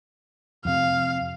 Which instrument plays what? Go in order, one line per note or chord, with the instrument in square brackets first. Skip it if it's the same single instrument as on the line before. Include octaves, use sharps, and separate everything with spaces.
[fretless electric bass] F2 C3 [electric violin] F5